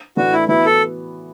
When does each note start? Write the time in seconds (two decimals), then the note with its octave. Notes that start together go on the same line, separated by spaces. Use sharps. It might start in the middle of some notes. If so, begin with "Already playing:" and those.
0.16 A2 E3 A3 D4 F#4
0.33 E4
0.48 E3 B3 E4 F#4
0.66 A4